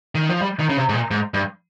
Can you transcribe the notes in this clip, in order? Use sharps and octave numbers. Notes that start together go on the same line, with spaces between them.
D#3
F3
G3
D#3
C#3
C3
G#2
A#2
G#2
G2